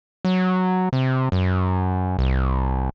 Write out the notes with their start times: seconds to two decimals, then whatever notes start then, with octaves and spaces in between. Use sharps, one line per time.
0.25 F#3
0.93 C3
1.32 F#2
2.19 C2